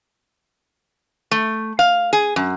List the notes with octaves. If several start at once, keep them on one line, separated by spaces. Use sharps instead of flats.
A3
F5
G#4
F#2